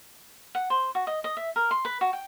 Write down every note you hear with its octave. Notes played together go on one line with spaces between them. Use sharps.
F#5
C5
F#4
D#5
D#5
E5
A#4
C6
B4
F#4
G5